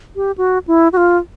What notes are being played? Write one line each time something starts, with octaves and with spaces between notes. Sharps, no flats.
G4
F#4
E4
F#4
F4